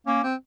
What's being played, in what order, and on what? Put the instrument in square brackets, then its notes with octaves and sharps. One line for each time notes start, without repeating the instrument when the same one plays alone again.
[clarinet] A#3 [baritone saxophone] C#4
[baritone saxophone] C4